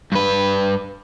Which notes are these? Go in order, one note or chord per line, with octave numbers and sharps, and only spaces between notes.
G2 B4